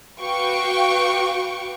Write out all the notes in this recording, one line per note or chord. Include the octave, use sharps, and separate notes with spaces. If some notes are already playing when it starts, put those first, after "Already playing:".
F#4 B4 F5 G5 C#6 D6